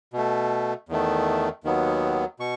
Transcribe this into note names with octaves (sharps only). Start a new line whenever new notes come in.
B2 A3
E2 D#3 A3
D#2 D#3 F#3 B3
B2 C#6